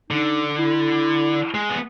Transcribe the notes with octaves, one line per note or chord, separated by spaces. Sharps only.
D3 D#4
E4
G#3
B3